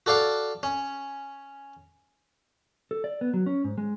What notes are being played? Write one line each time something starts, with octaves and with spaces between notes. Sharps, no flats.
F#4 A4 D5 F5 F#5
C#4
A4
D5
B3
F#3
C#4
G#2
G#3